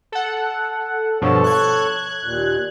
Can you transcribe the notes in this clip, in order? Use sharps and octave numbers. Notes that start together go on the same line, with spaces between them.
A4 F#5
G2 B2 F3 A4 C#5 A5
F#6 G#6
D#2 A#2